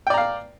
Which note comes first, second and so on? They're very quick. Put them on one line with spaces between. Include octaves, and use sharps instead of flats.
G5 D5 A#5 F5